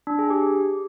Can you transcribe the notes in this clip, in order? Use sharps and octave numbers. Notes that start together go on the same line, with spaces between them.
D4
G#4
G4